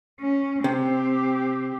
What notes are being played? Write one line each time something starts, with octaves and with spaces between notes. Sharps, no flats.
C#4
C3 C4 G4